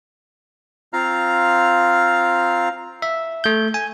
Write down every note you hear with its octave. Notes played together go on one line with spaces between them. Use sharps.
C4 F4 F5 A#5 F6
E5
A3 G6
G#5